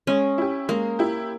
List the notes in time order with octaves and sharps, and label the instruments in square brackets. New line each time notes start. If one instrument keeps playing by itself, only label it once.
[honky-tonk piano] G#3 [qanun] C#4
[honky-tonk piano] E4 G4
[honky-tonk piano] G#3 [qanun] A#3
[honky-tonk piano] E4 G4